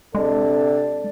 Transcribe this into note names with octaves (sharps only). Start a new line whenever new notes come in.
C3 G#3 D4 A4 D5